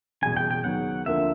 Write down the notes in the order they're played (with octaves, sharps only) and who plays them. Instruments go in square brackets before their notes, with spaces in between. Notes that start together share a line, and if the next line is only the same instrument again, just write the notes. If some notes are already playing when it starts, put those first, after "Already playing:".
[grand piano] F#1 E2 B2 G3 [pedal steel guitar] G#5
[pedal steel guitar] G5
G5
[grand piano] D#2 C#3 F#3 B3 [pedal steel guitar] F#5
[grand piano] D2 D3 F3 A#3 [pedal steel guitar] E5